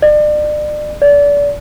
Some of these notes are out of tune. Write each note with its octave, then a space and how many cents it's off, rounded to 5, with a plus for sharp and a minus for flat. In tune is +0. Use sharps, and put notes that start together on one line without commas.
D5 +35
D5 -30